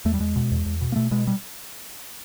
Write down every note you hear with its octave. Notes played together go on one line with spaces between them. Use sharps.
E2 A3
G3
E2 G#3
B2
E2
E2
B2
A#3
B2 A3
B2 G#3
G3